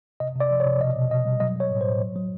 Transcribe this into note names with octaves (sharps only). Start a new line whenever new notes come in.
C3 D#5
C3 D5
F3
C#5
C3
B2 D#5
B2
B2 D#5
G3
F#3 D#5
F#3 C#5
A2
C5
A2
F#3
F#3